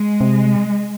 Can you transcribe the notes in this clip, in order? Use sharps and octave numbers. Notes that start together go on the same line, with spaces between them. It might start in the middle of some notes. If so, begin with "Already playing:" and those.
Already playing: G#3
C3